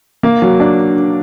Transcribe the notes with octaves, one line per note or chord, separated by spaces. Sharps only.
A#3
F#3
D4